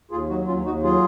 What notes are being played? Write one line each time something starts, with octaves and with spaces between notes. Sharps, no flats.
D#2 F4 G#4
F#3 D#4 F#4
D#2 C#4 F4
D#2 D#4 F#4
F#3 F4 G#4